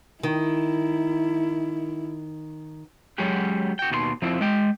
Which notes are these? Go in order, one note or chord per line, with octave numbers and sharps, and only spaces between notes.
D#3 E4
F#3 G#3 C#4 F#4 G4
F#4 G5
D#2 B2 F#4 C6
F3 C4 E4
G#3 G5